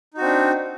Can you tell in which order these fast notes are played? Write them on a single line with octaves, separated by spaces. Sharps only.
D#4 F#4 C4 D4